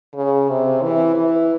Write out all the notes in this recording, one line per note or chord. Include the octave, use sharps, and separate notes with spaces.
C#3
C3
E3
E3